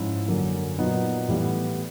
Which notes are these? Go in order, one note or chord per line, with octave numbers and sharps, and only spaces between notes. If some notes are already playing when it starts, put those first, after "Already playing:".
Already playing: G#2 F3 C#4 E4
F#2 D3 F#3 A#3
A#2 F#3 B3 D#4
A2 E3 G3 B3